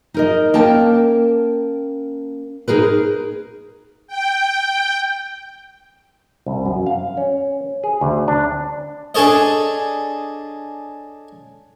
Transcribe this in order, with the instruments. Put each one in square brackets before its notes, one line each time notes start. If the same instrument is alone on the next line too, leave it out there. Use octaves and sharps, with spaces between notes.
[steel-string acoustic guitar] D#4 A#4 D#5
A#3 C#4 A#4 G5 A5
D#4 G#4 A#4 B4
[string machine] G5
[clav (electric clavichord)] C2
F#2
F5
C#4
G#4
D2
D4
[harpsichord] D4 G#4 A4 C#5 D#5